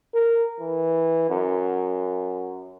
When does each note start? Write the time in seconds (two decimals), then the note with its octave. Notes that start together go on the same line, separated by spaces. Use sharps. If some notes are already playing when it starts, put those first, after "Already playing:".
0.14 A#4
0.60 E3
1.30 F#2